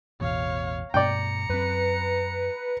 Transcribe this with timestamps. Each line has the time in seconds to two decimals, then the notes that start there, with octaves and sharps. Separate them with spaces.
0.21 A1 E2 B2 C#5 F5
0.94 G2 B2 D5 G5 A#5 C#7
1.49 F#2 C4 B4